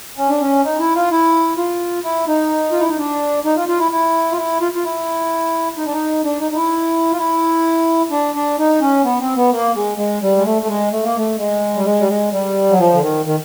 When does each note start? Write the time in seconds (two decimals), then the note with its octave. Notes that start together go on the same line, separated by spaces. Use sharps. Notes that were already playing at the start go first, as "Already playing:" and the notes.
0.17 C#4
0.29 D4
0.41 C#4
0.65 D#4
0.79 E4
0.95 F4
1.11 E4
1.57 F4
2.04 E4
2.28 D#4
2.72 F4
2.80 E4
2.89 D#4
2.98 D4
3.45 D#4
3.56 F4
3.68 F4
3.79 E4
3.92 E4
4.32 F4
4.37 E4
4.61 F4
4.75 F4
4.84 E4
5.78 D#4
5.86 D4
5.92 D#4
6.24 D4
6.41 D#4
6.52 D#4
6.56 E4
7.12 F4
7.18 E4
8.11 D4
8.35 D4
8.59 D#4
8.81 C#4
9.04 B3
9.20 C4
9.36 B3
9.51 A#3
9.75 G#3
9.98 G#3
10.22 G3
10.37 G#3
10.45 A3
10.62 A3
10.68 G#3
10.92 A3
11.04 A#3
11.17 A3
11.38 G#3
11.75 G3
11.85 G#3
12.00 G3
12.08 G#3
12.32 G3
12.70 F#3
12.78 F3
12.94 D3
13.01 D#3
13.25 D#3